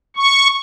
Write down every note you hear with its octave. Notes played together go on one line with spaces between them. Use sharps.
C#6